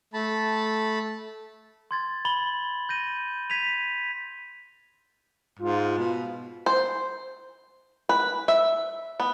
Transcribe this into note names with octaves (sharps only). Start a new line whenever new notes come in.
A3 A5 B5
C6 G#6 A6
B5 A6 F#7 G7
G6 A#6 D#7
G#6 B6 D#7 F7
G#2 F4
B2
C5
B4
E5
B3